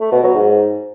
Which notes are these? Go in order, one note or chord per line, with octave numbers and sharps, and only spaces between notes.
A3
B2
F#3
G#2